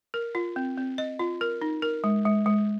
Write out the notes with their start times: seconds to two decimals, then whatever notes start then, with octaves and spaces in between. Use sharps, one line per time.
0.14 A#4
0.35 F4
0.56 C4
0.77 C4
0.98 D#5
1.19 F4
1.41 A#4
1.62 D#4
1.82 A#4
2.04 G#3
2.25 G#3
2.46 G#3